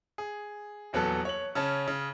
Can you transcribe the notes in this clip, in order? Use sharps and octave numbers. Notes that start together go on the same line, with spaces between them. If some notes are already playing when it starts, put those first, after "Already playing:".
G#4
D#1 E2 F#3 B3 A4 F#6
C#5 F#7
C#3 C#4 A5
C#3